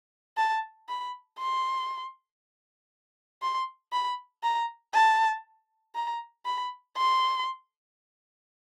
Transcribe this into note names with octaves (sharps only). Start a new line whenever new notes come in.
A5
B5
C6
C6
B5
A#5
A5
A#5
B5
C6